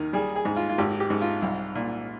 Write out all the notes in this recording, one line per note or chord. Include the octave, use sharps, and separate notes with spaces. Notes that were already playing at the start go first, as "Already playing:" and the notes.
Already playing: D#2 D#3
G3 G#4
G#4
G#2
F4
F4
G#1 G4
G4
G#2
F4
C2
A#2